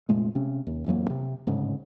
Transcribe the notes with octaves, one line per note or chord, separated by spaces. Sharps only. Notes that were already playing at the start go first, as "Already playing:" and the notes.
F1 A#2 G#3 A3
C3 C#4
D#2
A1 F2 F#3 A#3
C3
D1 G#2 C#3